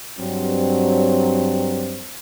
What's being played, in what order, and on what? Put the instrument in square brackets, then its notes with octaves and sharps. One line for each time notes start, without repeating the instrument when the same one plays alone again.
[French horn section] G2 F#3 C4